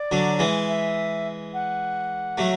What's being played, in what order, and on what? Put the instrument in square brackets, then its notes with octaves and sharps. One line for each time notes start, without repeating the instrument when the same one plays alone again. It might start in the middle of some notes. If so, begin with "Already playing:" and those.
Already playing: [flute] D5
[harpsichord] D3 F#3
E3 G#3
[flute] E5
F#5
[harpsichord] F#3 A3